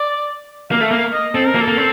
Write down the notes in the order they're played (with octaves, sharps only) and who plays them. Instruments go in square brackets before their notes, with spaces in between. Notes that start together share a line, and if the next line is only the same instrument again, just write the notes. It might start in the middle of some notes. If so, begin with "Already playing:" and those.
Already playing: [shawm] D5
[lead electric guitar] A#3 [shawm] F5
[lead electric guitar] A3
[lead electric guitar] A#3 [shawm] F5
[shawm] D#5
[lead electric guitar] C4 [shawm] A4
[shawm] A#4
[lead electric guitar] A#3
[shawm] A4
[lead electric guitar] A#3
C4